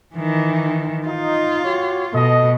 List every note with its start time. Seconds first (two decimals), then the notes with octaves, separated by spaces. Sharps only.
0.14 D#3 E3
1.07 D#4 F4
1.64 F#4 G4 C#5
2.14 B2 A4 D#5